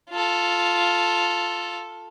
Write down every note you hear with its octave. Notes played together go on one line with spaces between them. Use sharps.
F4 A4